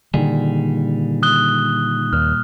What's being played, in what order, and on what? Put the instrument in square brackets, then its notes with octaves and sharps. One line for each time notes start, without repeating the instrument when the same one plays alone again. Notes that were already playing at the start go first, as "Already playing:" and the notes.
[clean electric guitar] A#2 G3 G#4 [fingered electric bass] D3 D#3
[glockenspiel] D#6 F#6 G7
[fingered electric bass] D#2 [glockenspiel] F6